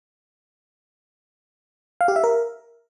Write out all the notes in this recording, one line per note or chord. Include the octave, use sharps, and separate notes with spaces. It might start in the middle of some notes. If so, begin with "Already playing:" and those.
F5
G4
E5
A#4